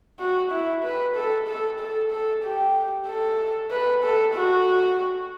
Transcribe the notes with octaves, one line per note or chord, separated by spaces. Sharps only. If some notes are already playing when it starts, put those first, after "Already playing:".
F#4
E4
B4
A4
A4
A4
A4
G4
A4
B4
A4
F#4